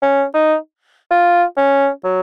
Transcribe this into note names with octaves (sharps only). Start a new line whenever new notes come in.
C#4
D#4
F4
C#4
F#3